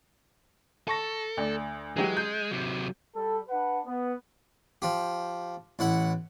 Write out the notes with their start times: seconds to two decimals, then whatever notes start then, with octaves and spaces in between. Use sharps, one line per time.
0.88 A4 A5 C#6 A#6
1.37 D2 D5
1.97 E3 F#3 G#3 G4
2.17 G6
2.51 C3 F#3
3.14 G3 A4
3.49 D4 B4 F#5
3.85 B3
4.82 F3 G4
5.79 A1 E4 F#5